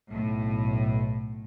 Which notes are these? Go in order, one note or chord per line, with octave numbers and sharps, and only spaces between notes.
B1 A2